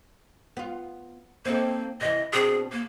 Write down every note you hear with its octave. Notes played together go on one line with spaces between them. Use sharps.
B3 F4
A#3 C4 D#4 A4
C3 E3 D#5
B2 C4 D4 G#4
A#3